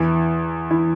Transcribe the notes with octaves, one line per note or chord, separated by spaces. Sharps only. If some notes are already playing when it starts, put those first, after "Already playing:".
Already playing: E2 E3
E3 E4